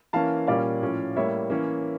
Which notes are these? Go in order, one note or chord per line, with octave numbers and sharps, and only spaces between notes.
E3 A#3 C#4 F5 A5
A#2 G3 A#3 C#4 D5 F5
A2 F3 C#4
A2 G3 A#3 C#5 E5
E3 A#3 C#4